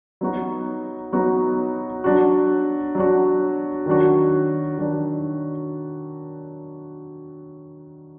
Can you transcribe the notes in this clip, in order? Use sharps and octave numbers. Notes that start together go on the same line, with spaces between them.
F#3 B3 D#4 F#4
F#3 B3 D#4 F#4
F#3 D4 F#4
F#3 D4 F#4
D#3 F#3 D4 F#4
D#3 F#3 D4 F#4